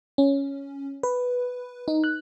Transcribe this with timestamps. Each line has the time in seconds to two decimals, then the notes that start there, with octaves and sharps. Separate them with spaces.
0.18 C#4
1.03 B4
1.88 D#4
2.04 F#6